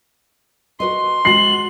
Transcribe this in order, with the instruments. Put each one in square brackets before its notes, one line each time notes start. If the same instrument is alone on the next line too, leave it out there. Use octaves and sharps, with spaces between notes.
[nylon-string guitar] F#4 B4 D#5 [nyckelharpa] C6
[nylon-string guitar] G#3 F#4 [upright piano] C7 [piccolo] F#7